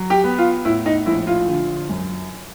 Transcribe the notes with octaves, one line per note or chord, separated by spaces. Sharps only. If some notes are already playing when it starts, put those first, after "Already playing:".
Already playing: F#3
G4
B3
F4
A2 E4
D#4
A#1 E4
F4
D3
F#2